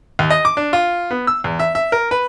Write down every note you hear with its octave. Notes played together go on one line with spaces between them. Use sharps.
D#2
D#5
D6
D4
F4
B3
E6
E2
E5
E5
A#4
B4